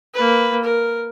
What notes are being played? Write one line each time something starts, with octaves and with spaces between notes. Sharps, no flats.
A#3 B4
A#4